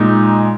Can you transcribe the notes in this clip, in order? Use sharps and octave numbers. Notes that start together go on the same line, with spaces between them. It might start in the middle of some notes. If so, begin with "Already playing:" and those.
Already playing: A#2 G#3 D#4